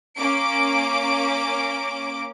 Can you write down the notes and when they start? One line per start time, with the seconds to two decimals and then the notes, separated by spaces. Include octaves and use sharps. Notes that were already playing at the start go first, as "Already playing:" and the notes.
0.16 A#3 C#4 D6 D7